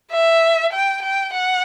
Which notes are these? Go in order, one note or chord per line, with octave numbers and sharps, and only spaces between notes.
E5
G5
G5
F#5